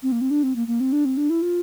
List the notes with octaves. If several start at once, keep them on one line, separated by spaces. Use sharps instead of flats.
C4
A#3
C4
D4
C4
A#3
A#3
C4
D4
C4
D4
E4
F4